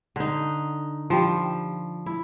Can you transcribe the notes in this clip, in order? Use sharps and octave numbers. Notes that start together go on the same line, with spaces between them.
D3 D#4
F3 G3
E4